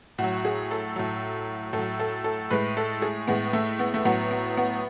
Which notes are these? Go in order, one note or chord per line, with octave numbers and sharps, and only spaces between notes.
A2 F#3 F#4
G#4
A4
A2 F#3
A2 A4
F#3
A4
A4
A2 G#3 B4
A4
G#4
A2 G#3 B3
A3
B3
A3
A2 F#3 B3
B3
B3